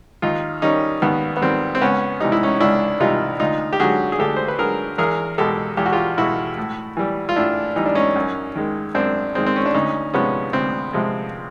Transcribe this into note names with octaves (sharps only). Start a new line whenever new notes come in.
D#2 D#4 F4
D#3 G3 C#4 D#4
D#2 B3
B3
D#3 G3 C4
C4
C#2 B3 C#4
C3 E3 G3 D#4
E4
C#4 D#4
C#2 D4 E4
C3 E3 G3 D#4 F4
D2 D#4 F4
G4
D3 F#3 F#4 G#4
G#4
D2 G4 A4
C5
B4
D3 F#3 G#4 A#4
E2 G#4 A#4
B2 G#3 G4 A4
E2 G4
F#4
F4 G4
B2 G#3 E4 F#4
A2
E3 G3
F4
A2 D4 E4
E3 G3 D#4
D4
C#4 D#4
F#2
D#3 G#3
F#2 C4 D4
D#3 G#3 C4
C4
C#4
D4
D2 C#4 D#4
C3 F3 G#3 B3 C#4
D2 C4
C3 F3 G#3